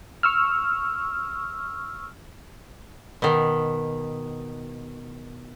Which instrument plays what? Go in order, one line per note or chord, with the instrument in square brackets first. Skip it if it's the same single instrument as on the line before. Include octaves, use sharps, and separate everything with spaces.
[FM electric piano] C#6 E6 F6
[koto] B2 D#3